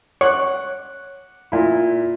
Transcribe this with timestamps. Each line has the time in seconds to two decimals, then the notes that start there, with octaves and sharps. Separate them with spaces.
0.21 C#5 F#5 D6 F#6
1.52 A#2 E4